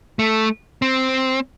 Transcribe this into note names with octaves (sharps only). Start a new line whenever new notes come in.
A3
C4